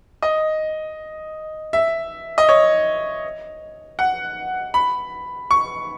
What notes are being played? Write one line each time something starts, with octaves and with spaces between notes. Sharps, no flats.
D#5
E5
D#5
C#5
F#5
B5
C#6